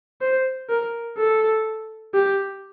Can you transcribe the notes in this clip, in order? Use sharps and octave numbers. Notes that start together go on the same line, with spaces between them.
C5
A#4
A4
G4